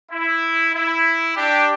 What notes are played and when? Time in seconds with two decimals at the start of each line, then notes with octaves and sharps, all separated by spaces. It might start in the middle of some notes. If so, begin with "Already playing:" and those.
0.11 E4
0.74 E4
1.36 D4 G4